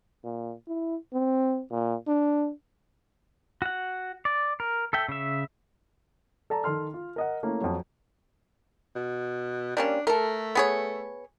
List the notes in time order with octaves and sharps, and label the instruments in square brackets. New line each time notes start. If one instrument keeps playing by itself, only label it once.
[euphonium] A#2
E4
C4
A#2
D4
[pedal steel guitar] F#4 F#5
D5
A#4
A4 E5 G5
C#3 E5
[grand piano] A4 D5 A5 A#5
D#3 A4 C6 F6
F4
A#4 D#5 F#5
A3 A#3 C#4 E4
F2 F#3
[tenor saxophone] B2
[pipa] G3 A#3 C#4 [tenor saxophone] D4
[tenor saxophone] A3 [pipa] A4 A#4
[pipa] B3 G#4 C#5